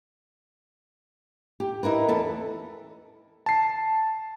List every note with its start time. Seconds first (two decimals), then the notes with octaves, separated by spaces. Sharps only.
1.60 G4
1.83 D#4 E4 A#4 B4
2.08 E2 A4 B4
3.46 A5 C7